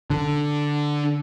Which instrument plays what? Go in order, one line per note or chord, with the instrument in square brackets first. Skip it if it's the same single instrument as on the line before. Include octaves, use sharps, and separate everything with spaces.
[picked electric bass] D3